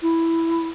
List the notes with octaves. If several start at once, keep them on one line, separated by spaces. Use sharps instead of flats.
E4